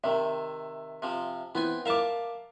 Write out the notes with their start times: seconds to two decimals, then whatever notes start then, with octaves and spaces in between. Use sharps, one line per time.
0.04 C3 D#3 E5
1.02 C3 F3
1.55 E3 B3 C4 G#5
1.86 A#4 E5 F5 A5 D6